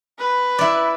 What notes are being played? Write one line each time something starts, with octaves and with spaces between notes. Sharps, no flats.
B4
E4 D5